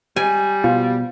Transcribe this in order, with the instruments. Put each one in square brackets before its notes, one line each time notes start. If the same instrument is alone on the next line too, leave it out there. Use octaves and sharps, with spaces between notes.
[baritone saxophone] G3 [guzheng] G#5
[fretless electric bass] B2 [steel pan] F4